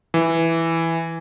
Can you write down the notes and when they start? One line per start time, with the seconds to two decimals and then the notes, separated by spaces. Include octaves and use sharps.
0.14 E3